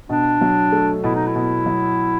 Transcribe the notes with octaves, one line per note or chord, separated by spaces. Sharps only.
B2 D4
F#3
A3
B2 E4
D#4
E4
B2
F#3